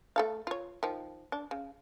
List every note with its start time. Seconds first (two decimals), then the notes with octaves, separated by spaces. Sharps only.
0.16 A3 A4 F5
0.47 F4 C#5
0.83 D#3 F3
1.32 D4
1.51 C#3